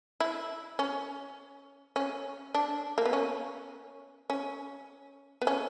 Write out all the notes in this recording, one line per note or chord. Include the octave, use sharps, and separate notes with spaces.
E4
C#4
C#4
D4
A#3
B3
C#4
C#4
B3
C#4